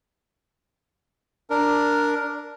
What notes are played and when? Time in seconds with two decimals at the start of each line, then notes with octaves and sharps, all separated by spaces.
1.50 D4 A#4